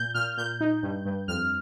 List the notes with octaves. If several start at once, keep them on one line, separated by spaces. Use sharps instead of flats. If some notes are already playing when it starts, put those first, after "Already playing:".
Already playing: A#2 G6
A#2 F6
A#2 G6
D#4
G2
G2
F2 F6